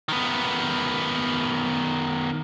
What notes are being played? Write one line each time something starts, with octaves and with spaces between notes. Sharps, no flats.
D#3 B3